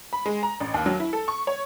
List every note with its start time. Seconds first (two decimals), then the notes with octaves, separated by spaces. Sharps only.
0.13 B5
0.26 G#3
0.43 A#5
0.60 A1
0.74 D#2
0.86 F#3
1.00 E4
1.13 A4
1.28 C#6
1.47 C#5